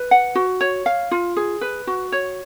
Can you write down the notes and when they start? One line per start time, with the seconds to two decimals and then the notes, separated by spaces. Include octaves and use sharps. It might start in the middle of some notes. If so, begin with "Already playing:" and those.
Already playing: B4
0.11 F#5
0.35 F#4
0.61 C#5
0.86 F5
1.11 F4
1.37 G#4
1.61 B4
1.87 F#4
2.12 C#5